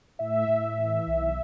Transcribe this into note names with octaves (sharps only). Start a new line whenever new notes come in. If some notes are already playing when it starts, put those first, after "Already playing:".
A2 E5
A2
E3
B1